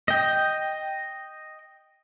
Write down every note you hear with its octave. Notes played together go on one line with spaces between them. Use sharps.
D#5 G5